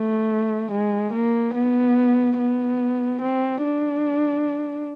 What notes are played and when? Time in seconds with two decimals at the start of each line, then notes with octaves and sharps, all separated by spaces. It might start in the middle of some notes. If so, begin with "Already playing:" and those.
Already playing: A3
0.71 G#3
1.13 A#3
1.55 B3
2.39 B3
3.22 C4
3.64 D4